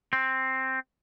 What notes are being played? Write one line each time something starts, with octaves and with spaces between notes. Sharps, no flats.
C4